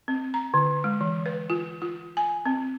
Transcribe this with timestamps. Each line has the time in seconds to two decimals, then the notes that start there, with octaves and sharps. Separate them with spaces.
0.08 C4
0.34 A#5
0.54 D3
0.84 G#3
1.01 E3
1.26 B4
1.50 F4
1.82 F4
2.17 G#5
2.46 C4